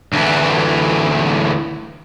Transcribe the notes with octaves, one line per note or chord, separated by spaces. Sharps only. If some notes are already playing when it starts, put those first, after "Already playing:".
D2 E3